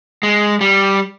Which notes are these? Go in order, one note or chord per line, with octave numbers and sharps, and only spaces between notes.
G#3
G3